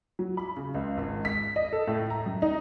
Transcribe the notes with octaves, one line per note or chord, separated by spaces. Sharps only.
F#3
B5
C#3
C#2
G#1
B6
D#5
A4
A2
A#5
F#2
D#4